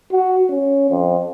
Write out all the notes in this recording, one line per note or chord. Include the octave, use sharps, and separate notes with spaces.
F#4
C#4
F2